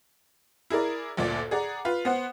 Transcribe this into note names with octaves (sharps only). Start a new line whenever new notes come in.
E4 G#4 A#4 D5
G1 D2 A#2 D5
G#4 D5 F#5 A#5
F4 B4
B3 C5 F#5